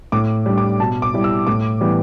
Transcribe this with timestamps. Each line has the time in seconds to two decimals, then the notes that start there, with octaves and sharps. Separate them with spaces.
0.12 A2 D6
0.46 G3 D4
0.58 D6
0.80 B2 A5
1.02 D6
1.14 G3 E4
1.24 E6
1.47 A2 D6
1.81 E3 G3 B3